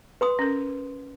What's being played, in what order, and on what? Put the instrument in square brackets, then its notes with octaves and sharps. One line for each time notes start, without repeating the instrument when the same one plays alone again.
[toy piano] B4 C6 D#6
[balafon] C#4 A#4